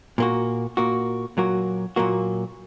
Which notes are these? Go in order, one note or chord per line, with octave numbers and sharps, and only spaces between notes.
A#2 A#3 F#4
A#2 A#3 F#4
A#2 F#3 A#3 F#4
A#2 F#3 A#3 F#4